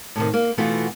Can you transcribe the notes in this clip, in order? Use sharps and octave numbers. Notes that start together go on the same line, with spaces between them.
A2 C3 D#3
A#3
B2 E3 A3 B3 F4 F#4